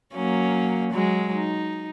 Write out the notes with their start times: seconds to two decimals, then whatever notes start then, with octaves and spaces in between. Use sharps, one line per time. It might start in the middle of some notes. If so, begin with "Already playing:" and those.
0.15 F#3 A#3 C#4
0.91 F#3 G#3
1.33 D#4